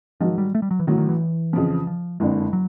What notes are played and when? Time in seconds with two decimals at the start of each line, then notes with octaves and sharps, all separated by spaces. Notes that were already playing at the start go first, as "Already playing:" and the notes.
0.20 G#2 D#3 F3 F#3
0.38 G3
0.55 A3
0.62 G3
0.71 F#3
0.80 E3
0.87 A1 A2 D#3 F#3
0.98 D#3
1.09 E3
1.53 F2 C#3 F3
1.87 F3
2.20 F#1 F2 D3 G#3
2.53 F#3